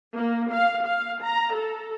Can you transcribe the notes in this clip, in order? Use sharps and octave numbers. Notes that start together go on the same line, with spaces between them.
A#3
F5
F5
A#5
A4